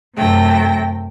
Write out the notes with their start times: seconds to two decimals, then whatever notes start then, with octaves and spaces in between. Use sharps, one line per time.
0.16 F#2 C3 A3 G5 A#6